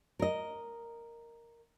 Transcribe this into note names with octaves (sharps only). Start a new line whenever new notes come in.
A#4 D#5